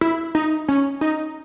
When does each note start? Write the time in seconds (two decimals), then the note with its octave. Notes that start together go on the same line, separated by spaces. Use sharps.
0.01 E4
0.35 D#4
0.68 C#4
1.01 D#4